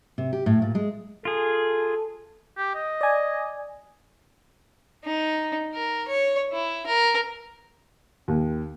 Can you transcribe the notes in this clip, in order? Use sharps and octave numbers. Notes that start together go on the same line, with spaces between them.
C3
G4
A2
A#2
G#3
F4 G#4 A4
G4
D#5
D5 G#5
D#4
A#4
C#5
E4
A#4
D#2